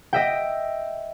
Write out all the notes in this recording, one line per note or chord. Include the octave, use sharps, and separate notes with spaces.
D#5 E5 G5